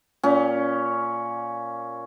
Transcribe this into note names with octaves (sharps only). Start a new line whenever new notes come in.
A#2 C#4